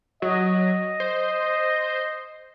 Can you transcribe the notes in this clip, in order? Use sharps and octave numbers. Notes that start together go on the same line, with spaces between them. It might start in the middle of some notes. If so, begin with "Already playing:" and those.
F#3 D#5
C5